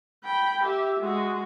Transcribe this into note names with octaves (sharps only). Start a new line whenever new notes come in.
G5 B5
G4 E5
G#3 F#4